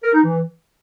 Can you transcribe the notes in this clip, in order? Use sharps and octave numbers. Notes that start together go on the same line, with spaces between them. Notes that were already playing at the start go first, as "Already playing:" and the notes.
A#4
D#4
E3